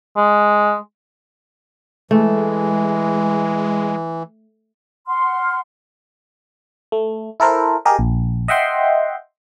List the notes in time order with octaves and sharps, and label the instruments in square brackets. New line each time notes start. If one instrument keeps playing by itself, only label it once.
[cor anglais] G#3
[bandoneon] E3 [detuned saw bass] G#3 [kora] A3
[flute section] F#5 C6 F6
[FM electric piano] A3
E4 A4 A#4 C5
G4 G#4 A#4 D#5
A#1
D#5 E5 F#5 G5 C6